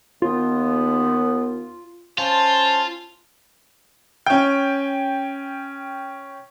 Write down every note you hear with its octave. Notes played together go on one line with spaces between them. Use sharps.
D#2 B3 F4
C#4 F4 C5 A5
C#4 G5